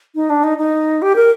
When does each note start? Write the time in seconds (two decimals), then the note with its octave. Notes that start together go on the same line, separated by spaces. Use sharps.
0.15 D#4
0.30 D4
0.44 D#4
0.58 D#4
1.02 G4
1.15 A#4